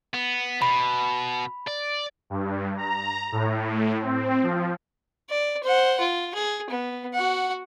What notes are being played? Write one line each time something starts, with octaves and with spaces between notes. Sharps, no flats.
B3
B2 B5
D5
G2
A#5
A2
C4
F3
D5
C5 F#5
F4
G#4
B3
F#4 F#5